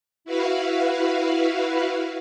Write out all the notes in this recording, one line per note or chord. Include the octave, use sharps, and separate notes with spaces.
E4 F#4 B4 F5